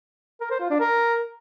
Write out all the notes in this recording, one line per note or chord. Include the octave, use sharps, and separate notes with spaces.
A#4
C5
F4
D4
A#4